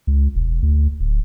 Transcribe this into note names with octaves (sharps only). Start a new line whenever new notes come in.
C#2
E1
D2
D1